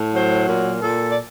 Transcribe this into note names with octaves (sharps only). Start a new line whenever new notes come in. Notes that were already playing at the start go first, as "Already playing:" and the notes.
Already playing: A2
F#3 C5
A#2 A#4
A#2 A4
D5